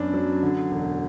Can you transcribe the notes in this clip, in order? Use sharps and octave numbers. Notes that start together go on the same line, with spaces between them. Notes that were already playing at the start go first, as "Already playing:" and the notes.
Already playing: F#2 B3 D4
F#3
D3
E1